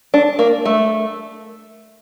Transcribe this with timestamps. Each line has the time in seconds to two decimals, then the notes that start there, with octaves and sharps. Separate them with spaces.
0.14 D4
0.39 A#3
0.65 A3